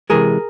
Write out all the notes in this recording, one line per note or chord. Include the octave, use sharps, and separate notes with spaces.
C3 E3 G#3 G#4 A#4